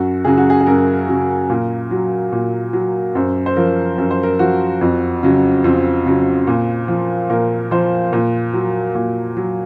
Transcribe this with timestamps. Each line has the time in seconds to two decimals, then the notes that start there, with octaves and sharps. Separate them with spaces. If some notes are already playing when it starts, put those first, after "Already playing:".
Already playing: F#2 F#4
0.25 C#3 F#3 G#4
0.38 F#4
0.50 G#4
0.60 G#4
0.66 F#2 A#4
1.08 C#3 F#3
1.50 A#2
1.91 F#3
2.32 A#2
2.73 F#3
3.15 F#2 C5
3.46 C5
3.56 F3 A#4
3.98 F#2 A#4
4.11 C5
4.23 A#4
4.39 F3 F#4
4.81 F2
5.23 C#3 F#3
5.64 F2 C4
6.06 C#3 F#3
6.47 A#2
6.88 F3
7.30 A#2 A#4
7.71 F3 C5
8.13 A#2
8.54 F#3
8.95 A#2
9.37 F#3